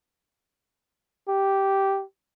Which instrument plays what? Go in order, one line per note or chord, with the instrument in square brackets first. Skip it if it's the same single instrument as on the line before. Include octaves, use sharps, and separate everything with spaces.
[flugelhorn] G4